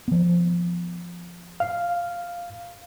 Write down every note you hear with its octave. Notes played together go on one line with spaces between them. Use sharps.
F3 B3
F5